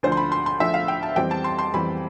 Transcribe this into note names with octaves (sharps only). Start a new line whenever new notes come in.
D2 D3 F3 C5
C6
B5
C6
C6
D2 D3 F3 E5
F5
G5
A5
F2 E3 G3 C4 G5
A5
C6
C6
F2 E3 G3 C4 B5